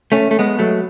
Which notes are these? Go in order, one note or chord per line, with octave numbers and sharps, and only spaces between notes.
A3 C#4
A3
G#3 B3
F#3 A3